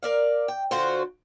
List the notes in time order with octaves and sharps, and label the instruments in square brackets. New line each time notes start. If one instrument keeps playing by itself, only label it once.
[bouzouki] A#4 D5 F5
G5
D3 F4 F#4 C5